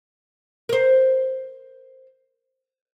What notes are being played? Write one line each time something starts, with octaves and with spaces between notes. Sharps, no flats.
A#4 C5